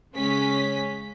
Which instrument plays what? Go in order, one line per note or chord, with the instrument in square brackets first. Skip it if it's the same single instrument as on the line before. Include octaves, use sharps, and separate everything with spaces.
[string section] C#3 G#3 C#4 B6